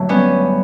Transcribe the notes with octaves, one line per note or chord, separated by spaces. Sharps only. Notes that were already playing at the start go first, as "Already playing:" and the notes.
Already playing: G1 F#3 A3
G3 B3 C#4